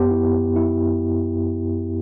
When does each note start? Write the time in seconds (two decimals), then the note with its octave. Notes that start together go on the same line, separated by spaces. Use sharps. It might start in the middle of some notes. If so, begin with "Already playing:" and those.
Already playing: F#2 B3 G4
0.10 E4
0.56 E4